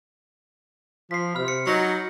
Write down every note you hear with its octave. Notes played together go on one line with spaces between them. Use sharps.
F3 B6 C7
C3 B5 F6
C#7
F#3 D#4 A#6